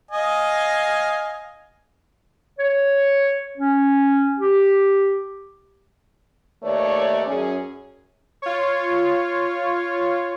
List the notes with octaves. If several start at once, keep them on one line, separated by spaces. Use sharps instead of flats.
D#5 F5 G#5
C#5
C#4
G4
D#2 A3 B4 C#5 D5
F#2 C#4 G#4
F4 C#5